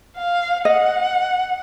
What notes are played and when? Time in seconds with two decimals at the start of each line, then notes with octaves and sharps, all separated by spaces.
0.17 F5
0.65 D#5 F#5